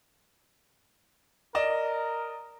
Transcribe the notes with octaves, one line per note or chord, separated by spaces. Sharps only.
A#4 D5 D#5 E7